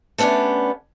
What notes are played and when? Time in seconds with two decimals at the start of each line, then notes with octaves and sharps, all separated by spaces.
0.18 A3 B3 C#4 D4 G4